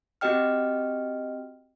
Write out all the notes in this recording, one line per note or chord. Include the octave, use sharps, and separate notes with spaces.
C4 F#4 G4 D#5 G5 F6